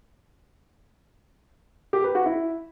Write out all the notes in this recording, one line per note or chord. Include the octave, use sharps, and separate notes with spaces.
G4
B4
F#4
E4